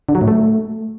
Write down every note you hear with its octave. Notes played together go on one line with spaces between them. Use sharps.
D3
F#3
A2
A3